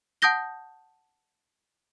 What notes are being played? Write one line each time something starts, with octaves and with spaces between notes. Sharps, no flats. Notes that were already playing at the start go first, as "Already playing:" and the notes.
F#5 A5 D#6 G6 A#6 G7